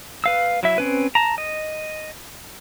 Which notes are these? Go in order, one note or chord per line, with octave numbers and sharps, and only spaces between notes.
B4 F5 E6
F#3 E4 E5
C4 C#4 B4
A5 A#5
D#5